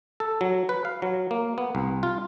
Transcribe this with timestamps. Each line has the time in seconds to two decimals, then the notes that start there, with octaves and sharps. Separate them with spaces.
0.20 A4
0.41 F#3
0.69 B4
0.85 F5
1.02 F#3
1.31 A#3
1.58 B3
1.75 C2
2.03 F4